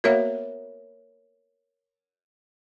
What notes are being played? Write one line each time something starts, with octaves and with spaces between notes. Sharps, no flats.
A#3 B3 F#4 A#4 C#5 E5